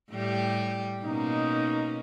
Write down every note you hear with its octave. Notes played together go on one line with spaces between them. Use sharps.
A2 G3 G4
B2 A#3 C#4 D#4